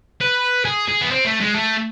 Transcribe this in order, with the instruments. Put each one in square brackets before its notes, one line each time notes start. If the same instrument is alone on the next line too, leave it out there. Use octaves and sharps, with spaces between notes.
[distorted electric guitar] B4
G#4
G#4
B3
C4
A3
G#3
A3